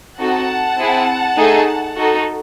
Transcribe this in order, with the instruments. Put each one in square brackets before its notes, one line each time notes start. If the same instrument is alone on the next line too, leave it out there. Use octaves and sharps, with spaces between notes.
[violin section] C4 D#4 F#4 A4 F#5 A5
C4 E4 G#4
A3 D#4 G#4
D#4 F#4 A4